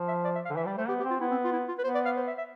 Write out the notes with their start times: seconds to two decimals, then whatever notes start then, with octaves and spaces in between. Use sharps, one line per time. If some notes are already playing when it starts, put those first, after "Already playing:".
Already playing: F3
0.08 E5
0.24 D5
0.35 E5
0.45 F5
0.50 D3
0.56 E3 E5
0.66 G3 D5
0.77 A3 C5
0.88 B3 G4
1.00 G4
1.05 C4
1.10 F4
1.21 B3 E4
1.31 C4
1.44 F4
1.53 E4
1.68 F4
1.78 B4
1.84 B3 C5
1.95 D5
2.05 F5
2.17 C5
2.27 E5
2.38 E5